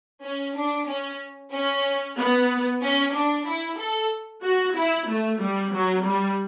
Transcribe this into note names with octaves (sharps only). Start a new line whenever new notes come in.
C#4
D4
C#4
C#4
B3
C#4
D4
E4
A4
F#4
E4
A3
G3
F#3
G3